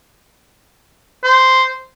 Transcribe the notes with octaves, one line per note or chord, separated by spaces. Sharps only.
C5